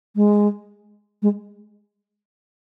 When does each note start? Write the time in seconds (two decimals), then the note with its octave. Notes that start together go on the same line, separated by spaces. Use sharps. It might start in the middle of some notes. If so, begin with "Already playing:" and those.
0.16 G#3
1.22 G#3